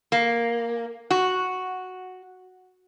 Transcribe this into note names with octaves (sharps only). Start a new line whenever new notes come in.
A#3
F#4